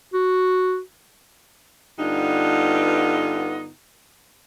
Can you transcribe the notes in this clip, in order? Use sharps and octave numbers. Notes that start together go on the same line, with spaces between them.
F#4
G2 D3 B3 D#4 F4